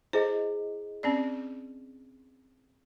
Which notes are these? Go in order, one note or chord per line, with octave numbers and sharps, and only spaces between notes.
E4 G#4 C5 D#5
C4 C#4 D5